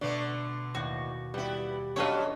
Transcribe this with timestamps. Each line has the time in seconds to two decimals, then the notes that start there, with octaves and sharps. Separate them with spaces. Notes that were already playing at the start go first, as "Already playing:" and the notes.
0.01 B2 D3 A3 B3 D5 C#6
0.75 D#2 A2 F#4
1.34 G3 B3 E4 G4
1.96 F#3 B3 C#4 D4 F4 A4 C#5 D#5